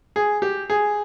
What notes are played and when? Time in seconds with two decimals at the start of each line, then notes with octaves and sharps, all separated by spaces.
0.16 G#4
0.42 G4
0.70 G#4